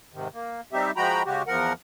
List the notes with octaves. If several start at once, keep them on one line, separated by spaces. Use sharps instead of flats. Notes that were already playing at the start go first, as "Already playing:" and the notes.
G#2 C3 D#3
A#3
G3 C4 D#4 G4 E5
F3 G#3 F#4 G5 A#5 B5
C#3 G#3 F#4 G4
E2 F3 A#4 F#5